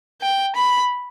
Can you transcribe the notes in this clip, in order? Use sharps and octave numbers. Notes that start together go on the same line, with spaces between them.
G5
B5